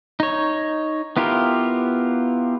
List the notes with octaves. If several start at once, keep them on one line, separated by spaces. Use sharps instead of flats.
D#4 C#5
B3 E4 F4 G4 A#4